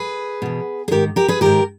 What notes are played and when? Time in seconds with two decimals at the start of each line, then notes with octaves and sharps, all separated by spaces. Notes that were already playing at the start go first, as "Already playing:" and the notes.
Already playing: G#4 B4
0.42 E2 B2
0.88 G#4
0.91 G#2 D#3 G4 A#4
1.16 G4 A#4
1.28 G#4 B4
1.41 G#2 D#3 G4 A#4